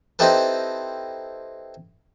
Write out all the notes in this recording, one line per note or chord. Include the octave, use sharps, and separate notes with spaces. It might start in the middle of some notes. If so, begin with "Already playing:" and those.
C4 D#4 E4 G4 A4 B4